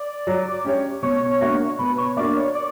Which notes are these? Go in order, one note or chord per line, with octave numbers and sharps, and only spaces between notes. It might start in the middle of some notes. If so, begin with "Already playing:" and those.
Already playing: D5
F#3
C#4 G4 C#5
B2 C#5
A#3 D4 F#4 A#4
B2 B4
C#5
A#3 D4 F#4 A#4 D5
C#5
D5